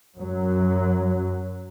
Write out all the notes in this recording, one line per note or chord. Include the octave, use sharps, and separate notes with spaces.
F#2 F#3